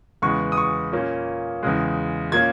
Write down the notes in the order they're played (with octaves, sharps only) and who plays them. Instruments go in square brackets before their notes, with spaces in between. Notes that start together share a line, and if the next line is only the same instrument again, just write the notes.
[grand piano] E2 C#3 G#3 B3 C#6
D#6
C#6
A#2 A#3 C#4
E2 C#3 G#3
A#2 A#3 C#4 G#6